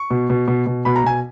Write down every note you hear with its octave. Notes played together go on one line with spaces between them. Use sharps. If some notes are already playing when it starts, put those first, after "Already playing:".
Already playing: C#6
B2
B2
B2
B2
B2 B5
A#5
B2 G#5